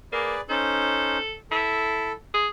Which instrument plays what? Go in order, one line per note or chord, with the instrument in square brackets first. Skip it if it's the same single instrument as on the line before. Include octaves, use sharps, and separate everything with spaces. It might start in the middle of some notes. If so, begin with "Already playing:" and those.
[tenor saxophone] A#3 [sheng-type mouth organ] G#4 B4 D5
[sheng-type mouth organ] C#4 D#4 C5 [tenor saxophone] A4
[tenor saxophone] E4 [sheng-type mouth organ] A4
[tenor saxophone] G#4